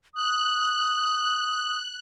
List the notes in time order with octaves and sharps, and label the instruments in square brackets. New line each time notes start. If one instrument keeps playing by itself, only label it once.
[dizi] D#6 [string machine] F#6